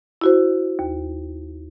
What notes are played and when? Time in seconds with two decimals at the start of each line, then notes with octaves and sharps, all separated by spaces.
0.21 E4 F#4 C5
0.79 D#2